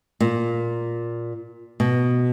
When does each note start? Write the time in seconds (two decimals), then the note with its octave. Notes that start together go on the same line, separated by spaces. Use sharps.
0.20 A#2
1.80 B2